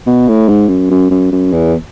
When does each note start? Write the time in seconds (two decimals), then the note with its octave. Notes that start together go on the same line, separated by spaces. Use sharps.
0.07 B2
0.28 A2
0.49 G#2
0.69 F#2
0.90 F#2
1.11 F#2
1.32 F#2
1.53 E2